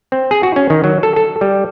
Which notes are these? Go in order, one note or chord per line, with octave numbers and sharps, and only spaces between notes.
C4
G#4
F#4
C#4
D#3
F#3
A4
A4
G3